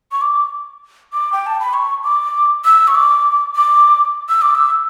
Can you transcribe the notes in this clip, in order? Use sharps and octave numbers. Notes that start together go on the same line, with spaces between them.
C#6
D6
D6
G5
A5
B5
C#6
D6
E6
C#6
D6
D6
E6
D6
E6